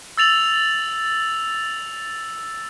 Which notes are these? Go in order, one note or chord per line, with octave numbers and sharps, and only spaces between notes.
E6 A6 F7 F#7